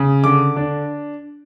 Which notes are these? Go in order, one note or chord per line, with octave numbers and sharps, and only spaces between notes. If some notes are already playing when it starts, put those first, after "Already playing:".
Already playing: C#3
D3 D6
D4